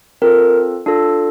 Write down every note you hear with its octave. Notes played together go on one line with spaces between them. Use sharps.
C4 F4 A4 A#4
D4 F4 A4